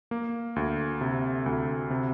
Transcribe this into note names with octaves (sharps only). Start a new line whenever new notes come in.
A#3
D2
C3
D2
C3